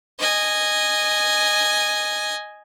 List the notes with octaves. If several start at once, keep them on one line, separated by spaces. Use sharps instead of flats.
D#5 G#5